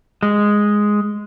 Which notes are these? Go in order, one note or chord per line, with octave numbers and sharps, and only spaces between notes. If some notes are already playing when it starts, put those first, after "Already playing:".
G#3